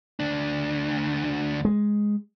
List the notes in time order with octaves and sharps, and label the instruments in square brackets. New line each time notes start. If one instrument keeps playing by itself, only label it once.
[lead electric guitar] D2 D4
[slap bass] G#3